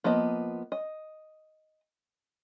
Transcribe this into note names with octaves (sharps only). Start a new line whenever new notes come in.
F3 A#3 B3 D#5
D#5